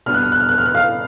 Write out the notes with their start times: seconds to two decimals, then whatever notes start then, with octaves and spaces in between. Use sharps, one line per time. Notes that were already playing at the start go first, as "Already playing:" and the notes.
0.06 B2 G3 B3 D4 F6
0.14 F#6
0.23 F6
0.32 F#6
0.40 F6
0.49 F#6
0.58 F6
0.66 F#6
0.75 F5 F6